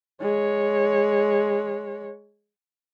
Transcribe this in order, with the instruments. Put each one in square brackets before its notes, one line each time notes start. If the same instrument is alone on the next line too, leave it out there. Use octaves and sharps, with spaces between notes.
[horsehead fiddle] G#3 C#5